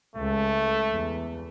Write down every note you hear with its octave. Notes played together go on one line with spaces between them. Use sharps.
C#2 A3
E2